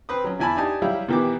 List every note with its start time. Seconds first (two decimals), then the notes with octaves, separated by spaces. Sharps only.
0.09 C4 B4 D#6
0.24 F#3 C#4
0.39 E2 E4 G#5 A5 B5
0.57 D4 D#4 G4 G#5 A5
0.82 F#3 G3 E4 G4 E5 F5
1.08 B2 D#3 E3 G4 D6